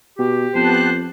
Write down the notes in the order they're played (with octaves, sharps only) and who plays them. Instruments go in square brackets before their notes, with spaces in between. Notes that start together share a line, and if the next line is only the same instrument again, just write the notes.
[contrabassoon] B2 [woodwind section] G4
[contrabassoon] F2 [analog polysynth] B3 A5 F#6 [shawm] C5